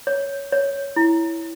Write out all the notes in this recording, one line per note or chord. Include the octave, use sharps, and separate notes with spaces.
C#5
C#5
E4